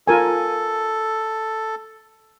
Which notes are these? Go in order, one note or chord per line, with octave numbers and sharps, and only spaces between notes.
F4 A4 A#4 G#5